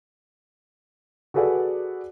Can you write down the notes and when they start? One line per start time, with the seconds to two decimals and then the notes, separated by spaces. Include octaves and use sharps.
1.34 F#4 G#4 A4 B4 D5 F#5